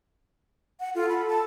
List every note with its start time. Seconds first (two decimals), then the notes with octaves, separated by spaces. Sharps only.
0.80 F#5
0.95 F4 A4
1.09 B5
1.28 A5